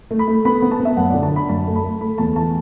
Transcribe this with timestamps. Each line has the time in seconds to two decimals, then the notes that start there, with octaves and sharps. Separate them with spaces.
0.11 A3
0.19 B5
0.28 A3
0.45 B3 B5
0.62 B3
0.71 A5
0.80 B3
0.85 E5
0.97 F#2 F#5
1.10 D3 D5
1.23 A5
1.31 D3 B5
1.49 F#2 A5
1.67 A3
1.75 B5
1.84 A3
2.01 A3 B5
2.18 E2 A5
2.36 E3 A5